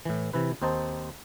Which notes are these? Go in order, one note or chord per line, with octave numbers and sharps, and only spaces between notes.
A2 E3
C3 E3 E4 B4
D#2 C4 D#4 C5 A5